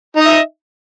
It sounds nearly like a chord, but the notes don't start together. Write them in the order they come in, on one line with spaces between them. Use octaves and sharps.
D#4 D#5 E5